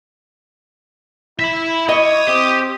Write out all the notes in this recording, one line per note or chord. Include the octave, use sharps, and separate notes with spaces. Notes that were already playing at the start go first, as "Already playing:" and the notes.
E4 E5 B5
C#5 D#5 D#6
C4 G4